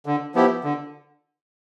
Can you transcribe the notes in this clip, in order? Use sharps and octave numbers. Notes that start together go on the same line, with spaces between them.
D3
F3 B3 E4 G4
D3